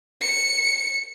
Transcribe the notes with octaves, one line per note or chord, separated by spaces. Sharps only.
C#7